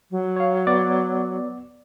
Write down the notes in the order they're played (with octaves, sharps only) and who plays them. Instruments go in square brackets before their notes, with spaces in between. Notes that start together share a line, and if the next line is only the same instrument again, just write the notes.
[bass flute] F#3
[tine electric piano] C#5 F5
B3 D5 D6